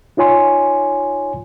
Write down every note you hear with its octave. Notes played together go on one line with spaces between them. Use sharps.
D#4 F4 C#5 G#5 C6